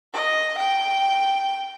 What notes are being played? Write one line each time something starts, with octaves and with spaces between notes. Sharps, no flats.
D#5
G5